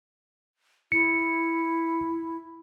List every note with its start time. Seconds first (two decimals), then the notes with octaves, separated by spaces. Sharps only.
0.92 E4 C#7